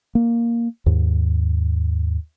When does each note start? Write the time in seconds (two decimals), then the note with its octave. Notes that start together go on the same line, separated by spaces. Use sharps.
0.15 A#3
0.86 D#2 G#2